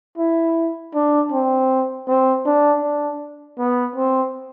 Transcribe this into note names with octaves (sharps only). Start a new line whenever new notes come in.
E4
D4
C4
C4
D4
D4
B3
C4